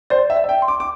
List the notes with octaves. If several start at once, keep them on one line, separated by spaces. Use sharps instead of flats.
C5 D5
E5
D5
E5
G5
C6
D6
D6